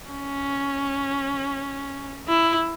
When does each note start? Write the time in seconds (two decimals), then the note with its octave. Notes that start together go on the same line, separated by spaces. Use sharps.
0.10 C#4
2.28 E4